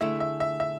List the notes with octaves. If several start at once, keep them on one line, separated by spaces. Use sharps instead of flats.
D3 A3 E4 G#4 E5
E5
E5
E5